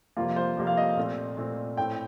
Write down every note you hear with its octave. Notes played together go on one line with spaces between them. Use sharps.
F2 C3 G3 A#3 F4
C5
F2 C3 G3 A#3
F5
D#5
A#2 A3 C4
A#2 A3 C4
A2 A3 C4 G5